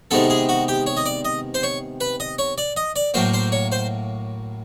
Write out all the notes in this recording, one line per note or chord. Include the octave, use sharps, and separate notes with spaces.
C3 D#3 G#3 B3 A4
G#4
F#4
G4
C#5
D#5
D5
D#5
C5
C#5
B4
D#5
C#5
D5
D#5
D5
A2 F#3 A#3 C5
C5
C#5
C5